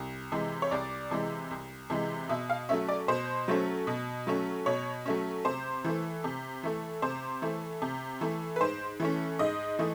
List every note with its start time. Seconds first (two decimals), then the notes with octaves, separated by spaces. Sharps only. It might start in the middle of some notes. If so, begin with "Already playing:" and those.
Already playing: C2
0.32 C3 E3 G#3
0.62 C#5
0.71 C2 D5
1.11 C3 E3 G#3
1.51 C2
1.90 C3 E3 G#3
2.29 B2 E5
2.50 F5
2.69 F#3 A3 C#4 E5
2.89 D5
3.08 B2 C5
3.48 F#3 A3 C#4
3.87 B2
4.27 F#3 A3 C#4
4.66 B2 C#5
5.06 F#3 A3 C#4
5.45 C3 C5
5.85 E3 A3
6.24 C3
6.63 E3 A3
7.02 C3 C5
7.42 E3 A3
7.82 C3
8.21 E3 A3
8.56 B4
8.61 G#2 C5
9.00 E3 A3 C#4
9.39 G#2 D#5
9.79 E3 A3